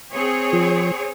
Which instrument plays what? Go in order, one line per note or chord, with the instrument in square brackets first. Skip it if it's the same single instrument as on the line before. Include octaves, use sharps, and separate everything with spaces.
[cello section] C4 G#4 C#5
[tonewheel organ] F3